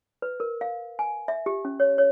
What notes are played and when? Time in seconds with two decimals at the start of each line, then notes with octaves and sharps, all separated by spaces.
0.22 B4
0.40 A#4
0.61 F5
0.99 G#5
1.28 E5
1.46 G4
1.65 C#4
1.80 C#5
1.98 C#5